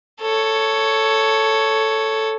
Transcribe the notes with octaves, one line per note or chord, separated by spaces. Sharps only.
A4 C#5